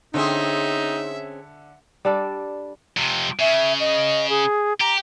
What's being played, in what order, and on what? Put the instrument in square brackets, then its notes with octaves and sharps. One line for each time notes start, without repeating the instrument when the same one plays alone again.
[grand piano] D3 [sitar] C4 C#4 G#4 [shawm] D#4 [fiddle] E5
[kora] G3 D4 A4
[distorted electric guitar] F2 C3
[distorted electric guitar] C#3 [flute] E5
[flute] D#5
G#4
[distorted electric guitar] G4 [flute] A#5